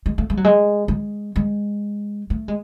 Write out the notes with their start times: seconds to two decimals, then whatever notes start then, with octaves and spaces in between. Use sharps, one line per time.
0.06 G#3
0.18 A3
0.30 G#3
0.37 F#3
0.44 G#3
0.88 G#3
1.36 G#3
2.30 A3
2.48 G#3